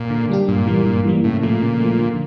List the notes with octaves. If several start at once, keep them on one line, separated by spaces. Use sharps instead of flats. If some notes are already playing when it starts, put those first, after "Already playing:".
Already playing: A#2
D3
G3 D4 G4
G2 A#2
E3 G3 A#3
G2
E3 G3 A#3
A2 C#3
A#2 F3 A3
C#3
F3 A3
D3